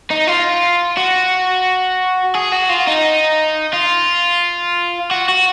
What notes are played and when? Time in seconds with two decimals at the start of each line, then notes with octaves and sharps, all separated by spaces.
0.11 D#4
0.27 F4
0.97 F#4
2.35 G#4
2.52 F#4
2.69 F4
2.87 D#4
3.73 F4
5.11 F#4
5.29 F#4